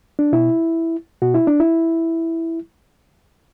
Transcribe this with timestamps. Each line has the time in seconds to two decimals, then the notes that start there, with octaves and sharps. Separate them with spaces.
0.19 D4
0.33 B2 E4
1.22 B2 F#4
1.34 E4
1.47 D4
1.60 E4